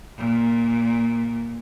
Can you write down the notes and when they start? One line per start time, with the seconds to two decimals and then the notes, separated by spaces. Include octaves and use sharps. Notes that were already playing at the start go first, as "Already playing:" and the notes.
0.17 A#2